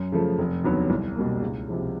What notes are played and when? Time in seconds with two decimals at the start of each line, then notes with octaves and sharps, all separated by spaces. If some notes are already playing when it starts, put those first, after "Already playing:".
Already playing: F#2
0.12 C#3 F3 A3
0.39 F1
0.64 D#2 D3 F#3 B3
0.90 C2
1.16 B2 G3 A#3
1.42 C#2
1.68 C3 F3 G#3